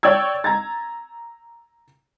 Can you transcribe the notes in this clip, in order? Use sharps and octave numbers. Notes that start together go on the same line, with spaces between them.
C#5 D5 G5 E6 G#6
A#5 G#6 A6